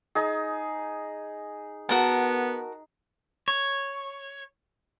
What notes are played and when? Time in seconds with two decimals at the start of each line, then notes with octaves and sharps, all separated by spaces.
0.15 D#4 G#4
1.89 B3 F#4 A#4 A5
3.48 C#5